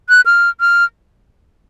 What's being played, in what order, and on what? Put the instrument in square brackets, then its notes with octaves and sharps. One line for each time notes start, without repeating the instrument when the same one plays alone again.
[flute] F#6
F6
F6